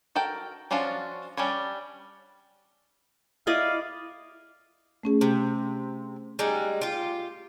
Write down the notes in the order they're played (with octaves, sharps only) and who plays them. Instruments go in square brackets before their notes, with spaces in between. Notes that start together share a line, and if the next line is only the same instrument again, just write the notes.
[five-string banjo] F#4 A4 A#4 G5
F3 C#4 D4 F4 F#4
G3 C#4 D4 C#5
[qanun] E4 D5 D#5 [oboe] F5
[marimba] A3 C#4 G#4
[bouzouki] C3
G3 G#3 D#4
F4 G4